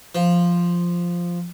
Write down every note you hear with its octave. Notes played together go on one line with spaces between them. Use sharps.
F3